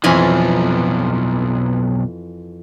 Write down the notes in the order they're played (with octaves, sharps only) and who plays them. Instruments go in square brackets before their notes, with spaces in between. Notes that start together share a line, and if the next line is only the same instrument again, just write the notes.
[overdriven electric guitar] B1 F3 [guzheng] F2 E3 G#5